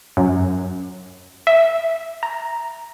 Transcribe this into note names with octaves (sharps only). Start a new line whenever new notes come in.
F#2
E5
A#5